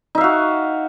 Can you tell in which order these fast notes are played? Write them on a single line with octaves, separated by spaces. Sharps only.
D#4 E5 F5 F#4